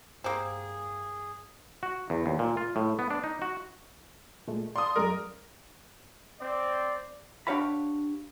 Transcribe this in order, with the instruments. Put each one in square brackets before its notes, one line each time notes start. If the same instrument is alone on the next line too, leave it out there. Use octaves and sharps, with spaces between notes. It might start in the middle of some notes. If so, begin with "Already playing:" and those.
[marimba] G2 [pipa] A#3 C4 [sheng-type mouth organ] G#4
[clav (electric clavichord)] F#4
E2
D#2
A#2
F4
A2
B3
D4
D#4
F#4
[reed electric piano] A#2 G#3 A3
[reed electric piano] D5 F5 A5 [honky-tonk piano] C6 D#6
[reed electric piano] F#2 G#3 D5 [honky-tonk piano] A#4
[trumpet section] C4 D5
[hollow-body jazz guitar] D4 G4 C#5 F5 F#5 B5